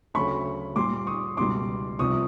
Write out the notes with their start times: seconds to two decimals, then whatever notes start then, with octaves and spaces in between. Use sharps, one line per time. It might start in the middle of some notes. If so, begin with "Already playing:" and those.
0.14 D2 C#3 F#3 A3 B5 C#6
0.76 A#2 G3 C6 D6
1.07 C#6 D#6
1.37 C#2 B2 G3 C6 D6
1.99 C2 C3 F3 C#6 D#6